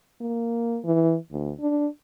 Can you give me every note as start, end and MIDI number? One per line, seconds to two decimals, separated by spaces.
0.21 0.78 58
0.85 1.16 52
1.31 1.52 38
1.60 1.87 62